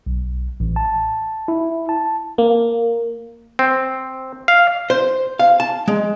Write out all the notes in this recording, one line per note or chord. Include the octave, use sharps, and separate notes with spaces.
B1
A1
A5
E4
A5
A#3
C4
F5
C5
F5
A5
G#3